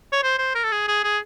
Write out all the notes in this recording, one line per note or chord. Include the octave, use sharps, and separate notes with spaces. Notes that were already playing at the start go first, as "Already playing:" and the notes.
C#5
C5
C5
A#4
A4
G#4
G#4
G#4